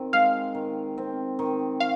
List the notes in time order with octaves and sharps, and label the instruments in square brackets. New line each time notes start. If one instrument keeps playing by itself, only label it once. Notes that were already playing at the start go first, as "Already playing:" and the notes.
Already playing: [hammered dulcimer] D#3 C4
[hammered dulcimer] G#3 [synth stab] F5
[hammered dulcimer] D#3
C4
D#3
[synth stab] F5